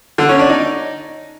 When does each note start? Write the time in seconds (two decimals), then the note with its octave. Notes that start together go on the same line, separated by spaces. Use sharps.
0.18 D3
0.29 C#4
0.39 D4
0.50 D#4